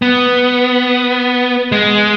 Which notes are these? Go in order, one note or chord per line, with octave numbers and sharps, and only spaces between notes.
B3
G#3